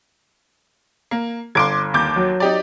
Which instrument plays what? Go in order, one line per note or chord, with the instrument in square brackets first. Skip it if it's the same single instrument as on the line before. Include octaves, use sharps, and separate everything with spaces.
[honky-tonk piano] A#3
[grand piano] G1 D7 [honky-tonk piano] C6 D6 G#6
[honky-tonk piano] D#2 D6 G6
[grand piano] F#3
[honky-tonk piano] D#4 G4 D5